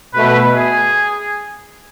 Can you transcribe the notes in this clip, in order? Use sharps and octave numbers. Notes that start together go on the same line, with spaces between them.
B2 A3 B4
G#4